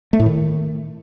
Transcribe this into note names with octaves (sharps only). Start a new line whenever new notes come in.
A3
A2
D#3